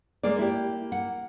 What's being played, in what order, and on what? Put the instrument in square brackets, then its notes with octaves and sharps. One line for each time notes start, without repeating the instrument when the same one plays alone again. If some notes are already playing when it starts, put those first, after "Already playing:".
[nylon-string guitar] G#3 G#4 D5 [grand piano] A#3
[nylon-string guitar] E4 G4
F#5